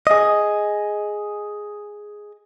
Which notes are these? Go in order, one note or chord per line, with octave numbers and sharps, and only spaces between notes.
G#4 D#5